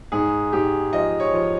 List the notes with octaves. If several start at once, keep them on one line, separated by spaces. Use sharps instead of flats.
G#2 G#4
G#2 G4
F3 D#5
C#5
F3